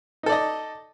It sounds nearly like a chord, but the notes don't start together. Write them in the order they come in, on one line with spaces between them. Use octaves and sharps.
D#4 A4 D5 D#5